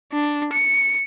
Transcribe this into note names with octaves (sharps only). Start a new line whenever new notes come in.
D4
C#7